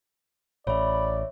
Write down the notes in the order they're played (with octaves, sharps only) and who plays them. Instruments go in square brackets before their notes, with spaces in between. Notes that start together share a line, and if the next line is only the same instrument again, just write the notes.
[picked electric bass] A1 [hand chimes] C#5 E5 [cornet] D5 [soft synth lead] B5